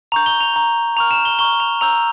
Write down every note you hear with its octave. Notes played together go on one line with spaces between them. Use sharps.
A#5 C#6 G6 F7
G7
F7
A#5 C#6 G6
A#5 C#6 F6 F7
E7
G7
A#5 C#6 F6 G7
F7
A#5 E6 G6 F7